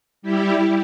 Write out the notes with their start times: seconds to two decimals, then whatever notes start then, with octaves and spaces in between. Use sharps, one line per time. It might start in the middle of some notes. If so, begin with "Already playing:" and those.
0.22 G3 E4 G4